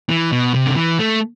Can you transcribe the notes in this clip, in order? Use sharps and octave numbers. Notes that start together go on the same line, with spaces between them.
E3
B2
C3
D3
E3
A3